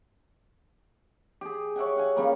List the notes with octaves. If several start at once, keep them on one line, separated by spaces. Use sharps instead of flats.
G4 G#4
C#5 E5 F#5 G5
F5 F#5 G#5
C#3 G3 A#3